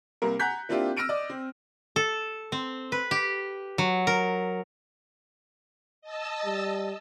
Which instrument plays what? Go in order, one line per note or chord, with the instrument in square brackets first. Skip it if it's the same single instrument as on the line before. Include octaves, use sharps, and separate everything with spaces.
[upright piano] C2 A#3 A#4
F#5 G#5 A#5 F#6 G6 B6
A#3 C4 D4 E4 F4 G4
E6 F6 A#6 D7 D#7
D5 D#5
C4
[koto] A4
C4
B4
G4
F#3
A#4
[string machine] D#5 A5 E6
[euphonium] G3